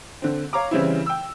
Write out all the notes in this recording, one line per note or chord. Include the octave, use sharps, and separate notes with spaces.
D3 C4
C#5 F5 A#5 D6
C#3 E3 G3 C4 C#4 E4
G5 E6